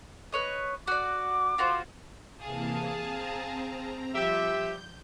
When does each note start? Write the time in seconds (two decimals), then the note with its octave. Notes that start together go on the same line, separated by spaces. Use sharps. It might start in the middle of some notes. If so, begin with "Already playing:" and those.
0.32 B4 C#5 D#5
0.87 F#4 D5 D6
1.58 F4 F#4 C5
2.43 C3 E3 A#3 G#4 F5 A5
3.03 C4 A#5
4.15 F3 G3 G4 E5 G6